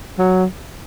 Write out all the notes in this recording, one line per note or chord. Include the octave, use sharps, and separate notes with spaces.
F#3